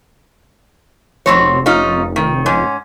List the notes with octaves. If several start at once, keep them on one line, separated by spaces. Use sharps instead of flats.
F1 B2 C4 C#5
C#4 D#4 F4
D#3
G#2 C#4